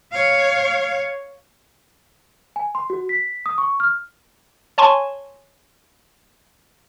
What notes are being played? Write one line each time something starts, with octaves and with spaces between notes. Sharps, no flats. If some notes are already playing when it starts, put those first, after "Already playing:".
C#5 F5
G#5
C6
F#4
B6
D#6
C#6
F6
C#5 G#5 A5 C6 C#6